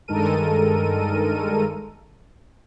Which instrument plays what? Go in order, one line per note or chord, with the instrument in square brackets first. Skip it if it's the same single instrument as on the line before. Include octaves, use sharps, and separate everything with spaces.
[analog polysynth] G2 D#3 G#3 A4 A#4 D#7